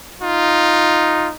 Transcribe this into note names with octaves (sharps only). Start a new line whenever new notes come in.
D#4 F4